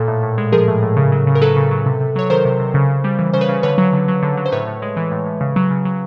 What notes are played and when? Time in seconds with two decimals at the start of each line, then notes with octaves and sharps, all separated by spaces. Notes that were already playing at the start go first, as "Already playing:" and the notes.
Already playing: A#2 A4
0.08 A2
0.23 A2
0.38 G#3
0.52 F3 G#4 A#4
0.68 A2
0.82 A2
0.97 C#3
1.12 F#3
1.27 C#3
1.35 A#4
1.41 F#3 A4 B4
1.57 C#3
1.71 F#3
1.86 C3
2.01 C3
2.16 F#3 C#5
2.30 D#3 A#4 C5
2.45 C3
2.60 C3
2.74 C#3
2.90 C#3
3.04 G3
3.19 E3
3.34 C#3 C5
3.41 B4 C#5
3.49 C#3
3.63 D3 B4 C#5
3.78 F#3
3.93 D3
4.08 F#3
4.23 D3
4.37 F#3
4.46 C5
4.52 A2 B4 C#5
4.67 A2
4.82 G#3
4.97 E3
5.11 A2
5.26 A2
5.41 C#3
5.56 F#3
5.71 C#3
5.85 F#3